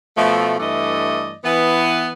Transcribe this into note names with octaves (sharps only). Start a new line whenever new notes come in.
B2 F3 A3
G2 E3 A3 D5 D#5
E3 B3